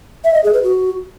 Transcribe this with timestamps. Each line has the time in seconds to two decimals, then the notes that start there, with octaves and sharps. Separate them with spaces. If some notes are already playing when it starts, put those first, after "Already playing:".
0.25 E5
0.34 D#5
0.44 G#4
0.54 B4
0.63 F#4